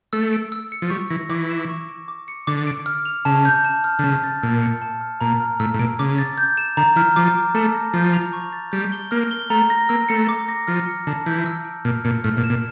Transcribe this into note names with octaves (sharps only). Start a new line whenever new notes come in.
A3 E6
D7
E6
C#7
F3
G3 C#6
E3 A#6
E3 D6
E7
C#6
D7
D6
C#7
D3 D6
D7
F6
F7
C#3 A5
G6
A5
F6
D3
C#3 A5
A6
A#2 E6
C#7
A5
F6
A#2 A#5
F6
A2 E6
A2
A#2 D7
C#3 D6
A6
G6
E7
D3 A#5
E3 F6
F3 D6
D7
A3 A5
A#6
F3 G6
F7
C#6
A6
G3 G6
G7
A#3 F6
G7
A3 A#5
A#6
A#3 E6
A3 C#7
D6
A#6
F3 F6
C#7
D3 A5
E3 G6
E6
D7
A#2 F6
A#2 C#7
A2 F6
A#2
E7
A#2